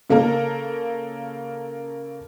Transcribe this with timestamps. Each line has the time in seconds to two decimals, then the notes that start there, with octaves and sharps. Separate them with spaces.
0.10 C#3 A#3 A4 A#4